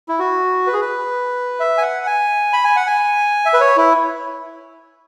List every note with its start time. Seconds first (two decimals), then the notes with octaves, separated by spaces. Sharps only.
0.09 E4
0.19 F#4
0.67 B4
0.73 G#4
0.81 B4
1.60 E5
1.78 G#5
1.82 F#5
2.06 G#5
2.53 B5
2.65 G#5
2.76 F#5
2.87 G#5
3.45 E5
3.53 B4
3.60 C#5
3.77 E4